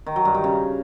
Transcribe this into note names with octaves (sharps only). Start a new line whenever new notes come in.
D#3
F#3
G2
D#3
C#3